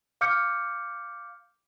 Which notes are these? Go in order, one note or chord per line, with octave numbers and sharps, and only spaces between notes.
F5 D6 F6 G6 C#7